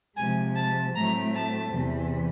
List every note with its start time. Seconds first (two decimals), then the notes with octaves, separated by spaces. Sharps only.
0.16 C3 F3 G#3 G#5
0.56 A5
0.95 A2 F#3 A3 C4 A#5
1.34 A5
1.74 E2 C3 E3